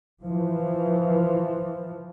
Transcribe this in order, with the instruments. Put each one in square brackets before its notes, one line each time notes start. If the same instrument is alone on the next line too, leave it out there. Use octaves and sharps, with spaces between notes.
[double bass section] E3 F3